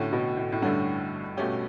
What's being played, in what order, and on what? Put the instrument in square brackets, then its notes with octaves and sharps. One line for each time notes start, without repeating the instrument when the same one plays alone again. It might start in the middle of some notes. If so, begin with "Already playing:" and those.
Already playing: [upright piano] A2 [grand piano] D3 A3 C#4 F#4
[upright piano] B2
A2
A2
[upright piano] G2 [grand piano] D3 A3 C#4 F#4
[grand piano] B2 A3 C#4 G4